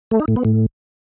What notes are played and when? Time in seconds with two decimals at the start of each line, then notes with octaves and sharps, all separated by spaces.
0.11 A3
0.20 D#4
0.28 A2
0.36 B3
0.45 A2